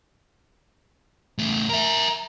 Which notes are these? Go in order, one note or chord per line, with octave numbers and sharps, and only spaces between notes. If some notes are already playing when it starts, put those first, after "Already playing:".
E2 A3
A#4 E5 A#5